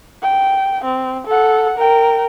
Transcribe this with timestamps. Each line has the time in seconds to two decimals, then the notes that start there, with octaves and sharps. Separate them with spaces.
0.22 G5
0.84 C4
1.27 A4 F#5
1.78 A#4 G5